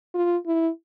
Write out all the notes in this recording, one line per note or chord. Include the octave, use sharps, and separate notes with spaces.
F4
E4